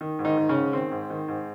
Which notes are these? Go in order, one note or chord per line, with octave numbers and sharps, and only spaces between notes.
D#3
G#2
D#3 D#4
D#3
C#3 C#4
G#2
D#3 C4
G#2
D#3
G#2